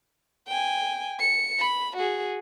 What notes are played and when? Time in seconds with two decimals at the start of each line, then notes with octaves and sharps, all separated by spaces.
0.47 G5 G#5
1.20 C#7
1.59 B5
1.97 F#4 G#4